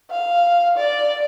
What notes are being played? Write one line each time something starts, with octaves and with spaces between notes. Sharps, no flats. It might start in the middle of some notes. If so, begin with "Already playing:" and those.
F5
D5